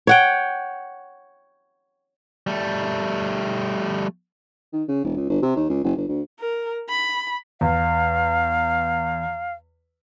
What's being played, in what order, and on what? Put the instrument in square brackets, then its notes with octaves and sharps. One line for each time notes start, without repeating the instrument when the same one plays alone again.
[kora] C#5 F#5 G5
[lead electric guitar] G3 A3
[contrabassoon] D#3
C#3
E1
C#2
G1
C3
D#2
C#2
F#1
G1
D2
[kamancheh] A#4
B5
[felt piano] E2 [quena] F5